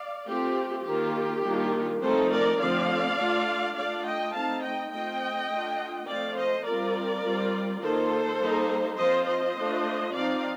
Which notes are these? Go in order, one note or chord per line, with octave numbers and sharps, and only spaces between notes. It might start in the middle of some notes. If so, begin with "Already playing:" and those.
Already playing: D5 F5
A3 C4 F4 G4
D#3 A#3 F4 G4
D#3 G3 A#3 D4 F4
F3 A3 C4 D#4 A4 C5
A#4 D5
D3 F3 A3 C4 D5 F5
A3 D4 F4
A3 D4 F4 D5 F5
D#5 G5
A3 C4 D#4 F5 A5
D#5 G5
A3 C4 F4 D#5 G5
A3 D4 F4
F3 A3 C4 D5 F5
C5 D#5
G3 C4 F4 A#4 D5
G3 C4 F4
D#3 A#3 F4 A4 C5
G3 A#3 D#4
F3 C4 F4 C5 D#5
C5 D#5
A3 D4 F4
F3 C4 D#4 D5 F5